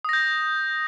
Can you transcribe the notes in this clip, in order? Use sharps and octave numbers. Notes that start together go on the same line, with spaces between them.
D#6 G6 A#6